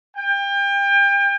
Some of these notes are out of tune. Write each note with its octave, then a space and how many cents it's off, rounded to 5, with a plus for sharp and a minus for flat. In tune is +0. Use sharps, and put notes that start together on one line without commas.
G5 +30